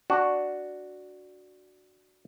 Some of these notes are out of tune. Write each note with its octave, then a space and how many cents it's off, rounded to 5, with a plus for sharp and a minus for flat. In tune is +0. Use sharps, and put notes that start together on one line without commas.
D4 +0 F#4 +0